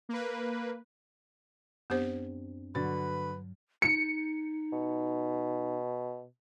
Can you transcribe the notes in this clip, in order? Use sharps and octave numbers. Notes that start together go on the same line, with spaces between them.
A#3 B4
F#2 B3 C4 D4 G4 C5
G2 D3 F#3 F#4 B4 A6
D#4 C#7
B2